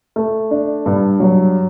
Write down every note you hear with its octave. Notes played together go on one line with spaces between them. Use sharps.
A3
D4
G2
F#3